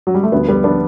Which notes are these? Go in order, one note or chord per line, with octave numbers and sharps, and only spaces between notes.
F#3
G3
A3
D2 D3 G3 B3
G3 B3
B3 D4